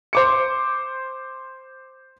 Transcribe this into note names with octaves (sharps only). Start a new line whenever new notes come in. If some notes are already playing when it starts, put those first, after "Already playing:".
C5 D6 C#7